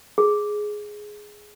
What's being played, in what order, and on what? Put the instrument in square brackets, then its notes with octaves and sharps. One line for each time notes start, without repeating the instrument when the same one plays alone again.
[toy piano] G#4